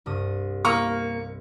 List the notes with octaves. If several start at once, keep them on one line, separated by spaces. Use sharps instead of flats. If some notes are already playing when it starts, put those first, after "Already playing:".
C2 G2 D#6
A#3 E4 D#5 F5 C#6